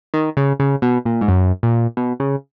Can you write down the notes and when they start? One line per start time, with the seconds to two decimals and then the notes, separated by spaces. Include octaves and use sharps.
0.14 D#3
0.37 C#3
0.60 C#3
0.82 B2
1.05 A#2
1.21 G#2
1.28 F#2
1.63 A#2
1.97 B2
2.20 C#3